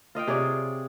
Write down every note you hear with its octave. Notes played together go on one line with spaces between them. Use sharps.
F4 D#5 F5 G5
C3 G#4 C#5 D5